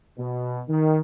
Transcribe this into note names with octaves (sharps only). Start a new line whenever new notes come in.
B2
D#3